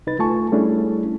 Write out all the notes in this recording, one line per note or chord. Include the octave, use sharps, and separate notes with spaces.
C2 D#4 B4 A6
D2 A3 F4 G#5 A5 C#6
G3 A3 C#4 D4 E4 G#4